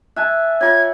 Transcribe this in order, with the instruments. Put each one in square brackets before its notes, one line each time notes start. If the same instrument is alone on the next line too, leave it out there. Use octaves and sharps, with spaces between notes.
[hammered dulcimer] E5 G#5 A5 [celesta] F#6
[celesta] F4 C#5 [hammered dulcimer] G4 F#5 [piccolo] G#6